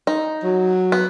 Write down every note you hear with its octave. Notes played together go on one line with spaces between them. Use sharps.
D#4
F#3
B3